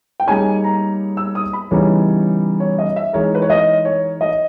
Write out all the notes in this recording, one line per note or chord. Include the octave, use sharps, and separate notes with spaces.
G5
G3 A#3 D#4 G#4 C#5 G#5
A#5
E6
D#6
B5
C#3 E3 G3 B3 D#4 C#5
C#5
D#5
E5
E3 G#3 D#4 A#4 C#5
B4
C#5
D#5
C#5
D#5